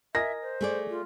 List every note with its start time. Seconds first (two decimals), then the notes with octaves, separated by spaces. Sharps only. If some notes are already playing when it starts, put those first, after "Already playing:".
0.15 A#4 D#5 E5 G#5 A#6
0.42 C5
0.61 A3 G#4 D5
0.90 F4